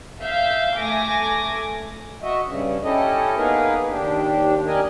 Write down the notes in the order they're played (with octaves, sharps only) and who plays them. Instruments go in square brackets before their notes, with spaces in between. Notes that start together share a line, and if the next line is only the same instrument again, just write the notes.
[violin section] E5 F5 G6
A3 G#5 D6 A#6
[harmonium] F#4 D#5 E5
G2 C#3
C#4 E4 G4 A4 D#5
A#3 B3 D#4 G#4 A#4 B4
D#2 D4 G4
G4 A#4 D5 D#5 G#5